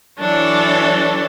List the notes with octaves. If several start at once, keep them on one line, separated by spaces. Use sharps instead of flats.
E3 F#3 D4 A4 C#5